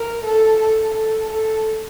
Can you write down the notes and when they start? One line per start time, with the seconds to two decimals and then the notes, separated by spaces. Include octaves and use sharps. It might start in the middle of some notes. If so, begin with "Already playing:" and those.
Already playing: A#4
0.24 A4
0.60 A4
0.95 A4
1.30 A4